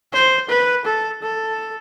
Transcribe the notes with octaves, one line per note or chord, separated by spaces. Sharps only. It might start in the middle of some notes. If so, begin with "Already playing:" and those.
C5
B4
A4
A4